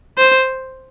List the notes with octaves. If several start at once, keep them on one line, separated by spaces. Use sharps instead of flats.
C5